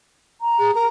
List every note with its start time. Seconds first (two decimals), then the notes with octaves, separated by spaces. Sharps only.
0.41 A#5
0.59 G#4
0.75 A#4 A#5